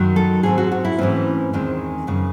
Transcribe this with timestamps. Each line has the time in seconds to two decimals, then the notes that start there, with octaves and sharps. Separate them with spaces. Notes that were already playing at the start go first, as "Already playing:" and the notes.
Already playing: F#2 D#3 F#3
0.16 A4
0.43 G#2 F#3 C4 G#4
0.58 F#4
0.72 F#4
0.85 E4
0.98 G#2 E3 A3 C4 C#4
1.53 E2 D#3 G#3 C4
2.07 F#2 C#3 G#3